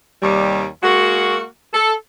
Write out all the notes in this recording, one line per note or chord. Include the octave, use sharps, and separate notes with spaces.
D#2 C3 G3
G#3 A#3 F#4
A4